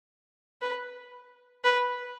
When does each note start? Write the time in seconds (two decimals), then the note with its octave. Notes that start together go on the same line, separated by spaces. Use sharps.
0.61 B4
1.64 B4